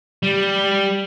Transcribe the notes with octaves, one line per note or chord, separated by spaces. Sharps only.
G3